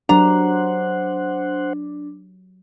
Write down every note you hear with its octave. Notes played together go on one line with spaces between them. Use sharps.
F#3 D4 G4 A#4 C5 F#5 A#5